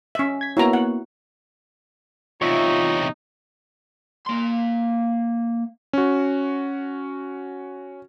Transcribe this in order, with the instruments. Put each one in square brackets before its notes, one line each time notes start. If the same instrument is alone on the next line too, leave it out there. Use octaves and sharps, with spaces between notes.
[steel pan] C#4 E5
[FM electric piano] G#6 B6
[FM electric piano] A#3 B3 C#5 [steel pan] E4 F#4 A#5
[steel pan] F#5
[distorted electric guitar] E2 C3 [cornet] D#4 [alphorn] F4 [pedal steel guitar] C#5 E5
[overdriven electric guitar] A#3 C6
[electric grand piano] C#4 F#4